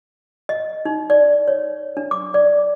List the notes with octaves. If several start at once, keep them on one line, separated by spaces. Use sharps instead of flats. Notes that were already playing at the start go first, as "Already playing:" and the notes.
D#5
D#4
D5
C#5
D4
D6
D5